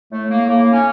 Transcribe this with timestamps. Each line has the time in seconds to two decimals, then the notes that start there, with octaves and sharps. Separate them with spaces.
0.12 A2 A3
0.30 A#3
0.48 A2 A#3
0.73 C#4